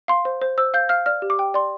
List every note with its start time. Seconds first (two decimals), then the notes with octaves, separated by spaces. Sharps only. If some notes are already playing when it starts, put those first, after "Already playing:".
0.08 F5 C6
0.25 C5
0.42 C5
0.58 C5 E6
0.74 F5 G6
0.89 F5 F6
1.06 D5 F6
1.22 G4
1.30 D6
1.39 G5
1.54 D5 C6